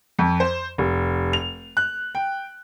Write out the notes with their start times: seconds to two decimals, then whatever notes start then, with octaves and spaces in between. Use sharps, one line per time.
0.19 F2
0.40 C5
0.78 F1
1.33 F7
1.77 F#6
2.15 G5